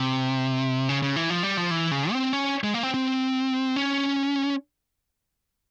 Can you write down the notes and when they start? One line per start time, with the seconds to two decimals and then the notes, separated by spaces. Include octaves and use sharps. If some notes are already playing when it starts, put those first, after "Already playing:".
Already playing: C3
0.89 C#3
1.02 C#3
1.16 E3
1.30 F3
1.43 G3
1.57 F3
1.71 E3
1.91 C#3
2.12 C4
2.33 C#4
2.64 G#3
2.74 A#3
2.83 C4
2.94 C4
3.76 C#4